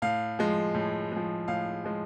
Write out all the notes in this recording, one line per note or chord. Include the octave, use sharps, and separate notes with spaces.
A2 F5
F3 G#3
A2
F3 G#3
A2 F5
F3 G#3